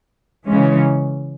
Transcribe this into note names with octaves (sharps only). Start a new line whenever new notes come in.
C#3 E3 G#3 C#4